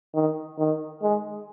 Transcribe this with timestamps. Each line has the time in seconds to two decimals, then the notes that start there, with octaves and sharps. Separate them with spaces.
0.14 D#3
0.59 D#3
1.02 G#3